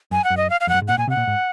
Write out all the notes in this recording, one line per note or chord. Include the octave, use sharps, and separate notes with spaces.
F#2 G#5
F#5
F#2
D#5
F5
F5
F2 F#5
F#2
G#2
A#2 F#5
A#2 G#5
C3 F#5
A#2
G#2